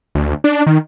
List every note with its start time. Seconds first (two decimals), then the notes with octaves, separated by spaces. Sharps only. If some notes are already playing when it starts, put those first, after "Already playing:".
0.15 D2
0.44 D4
0.67 D#3